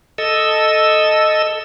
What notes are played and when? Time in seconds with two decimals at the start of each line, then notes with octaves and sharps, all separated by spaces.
0.18 A4 D#5 E6